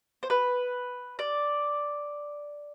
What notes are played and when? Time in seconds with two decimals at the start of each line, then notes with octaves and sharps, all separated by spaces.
0.23 C5
0.30 B4
1.19 D5